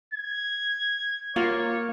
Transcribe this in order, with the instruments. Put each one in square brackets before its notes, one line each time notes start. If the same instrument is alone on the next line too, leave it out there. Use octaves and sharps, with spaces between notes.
[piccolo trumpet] G#6
[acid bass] A#3 [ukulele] F4 [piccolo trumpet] C#5